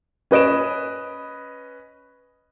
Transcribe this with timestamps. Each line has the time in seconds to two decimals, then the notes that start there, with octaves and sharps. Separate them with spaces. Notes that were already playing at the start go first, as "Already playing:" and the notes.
0.31 C#4 B4 D#5 D7 E7